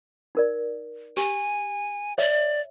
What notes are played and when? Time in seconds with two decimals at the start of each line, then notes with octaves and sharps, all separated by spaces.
0.35 D#4 A#4 D5
1.17 G4 G#5
2.18 C#5 D5 E5